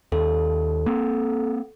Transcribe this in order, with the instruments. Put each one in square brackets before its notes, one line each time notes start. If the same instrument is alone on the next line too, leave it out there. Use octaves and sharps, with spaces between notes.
[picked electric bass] D#2 [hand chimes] A4
[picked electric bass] A#3 C4